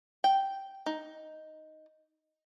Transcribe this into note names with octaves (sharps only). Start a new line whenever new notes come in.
G5
D#4